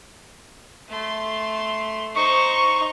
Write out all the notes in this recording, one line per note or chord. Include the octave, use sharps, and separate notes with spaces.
A3 C6
D#4 C5 C#6